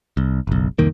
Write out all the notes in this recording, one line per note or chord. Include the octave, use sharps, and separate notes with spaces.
C2
F#1 B1
C2 F2 D#3 A#3